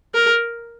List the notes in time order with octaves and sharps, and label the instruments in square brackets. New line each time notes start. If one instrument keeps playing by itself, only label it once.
[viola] A#4